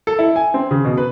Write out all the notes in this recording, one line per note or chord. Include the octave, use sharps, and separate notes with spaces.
A4
E4
G#5
C4
C#3
B2
B4